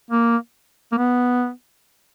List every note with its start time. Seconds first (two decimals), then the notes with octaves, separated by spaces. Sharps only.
0.11 A#3
0.92 A#3
0.98 B3